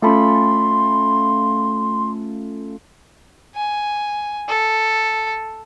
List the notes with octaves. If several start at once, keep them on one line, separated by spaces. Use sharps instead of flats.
A3 C#4 F4 A4 B5 C6
G#5
A4